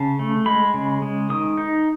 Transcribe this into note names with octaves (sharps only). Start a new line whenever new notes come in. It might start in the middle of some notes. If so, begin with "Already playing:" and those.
Already playing: C#3 A5
A3
G#3 B5
C#3
G#3
D#3 D#6
D#4